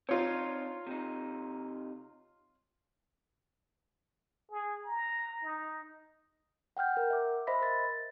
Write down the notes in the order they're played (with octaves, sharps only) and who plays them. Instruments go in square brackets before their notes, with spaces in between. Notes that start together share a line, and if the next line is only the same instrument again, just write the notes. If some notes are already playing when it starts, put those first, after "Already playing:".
[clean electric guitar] C4 D4 D#4 [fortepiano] F4 C#5
[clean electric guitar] C3 D#4
[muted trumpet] G#4
A#5
D#4
[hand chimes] F#5 G5 F6 G6
A#4 F#5
E5 D6
C5 D#5 E5 B5 A#6 B6
A#4 A6